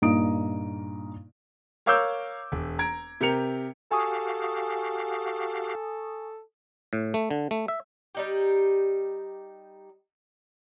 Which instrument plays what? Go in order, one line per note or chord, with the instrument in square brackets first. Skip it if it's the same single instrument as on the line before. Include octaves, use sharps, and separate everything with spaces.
[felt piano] G2 A#2 A#3 D#4 D#6 D7
[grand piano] A#4 C#5 F5 D6 E6 G6
E1
A#5 G#6 D7
C3 G4 A#4 C#7 F7
[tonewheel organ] F#4 G4 F5 [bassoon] A4 [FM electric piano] G#5 C#6 D#6
[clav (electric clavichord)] A2
A3
D3
A3
E5
[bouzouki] G3 D#4 G4